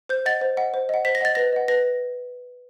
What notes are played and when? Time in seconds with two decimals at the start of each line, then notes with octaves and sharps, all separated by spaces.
0.09 C5 G6
0.26 D#5 F#5 A6
0.41 C5
0.57 D#5 F#5
0.74 C5
0.89 D#5 F#5
1.05 C5 B6
1.15 A#6
1.21 D#5 F#5 A6
1.35 B4 A#6
1.53 D#5 F#5
1.68 B4 A#6